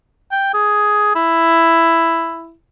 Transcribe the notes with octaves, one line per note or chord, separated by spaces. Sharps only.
G5
G#4
E4